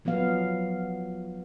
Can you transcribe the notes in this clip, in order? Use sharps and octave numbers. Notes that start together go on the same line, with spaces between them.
F3 F#3 B3 F5